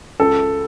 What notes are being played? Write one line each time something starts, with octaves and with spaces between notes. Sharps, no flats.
C#2 A4